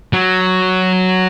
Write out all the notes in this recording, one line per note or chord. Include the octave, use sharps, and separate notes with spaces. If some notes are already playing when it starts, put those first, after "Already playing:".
F#3